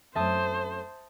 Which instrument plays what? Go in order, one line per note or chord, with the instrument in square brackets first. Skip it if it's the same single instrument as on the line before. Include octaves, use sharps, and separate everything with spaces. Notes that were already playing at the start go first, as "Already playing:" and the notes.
[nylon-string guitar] F#2 A3 C4 [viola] C5 [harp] E5 A5 D#6